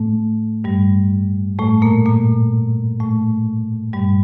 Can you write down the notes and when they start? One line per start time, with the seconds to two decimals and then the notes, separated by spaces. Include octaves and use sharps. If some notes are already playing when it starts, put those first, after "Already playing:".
Already playing: A2 A3
0.64 G2 G3
1.59 A2 A3
1.82 A#2 A#3
2.06 A#2 A#3
3.00 A2 A3
3.93 G2 G3